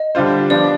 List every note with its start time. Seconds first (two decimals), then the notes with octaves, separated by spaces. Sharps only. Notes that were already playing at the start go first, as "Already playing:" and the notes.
Already playing: D#5
0.15 D3 G3 D4 F4 C5
0.50 F3 B3 D4 D5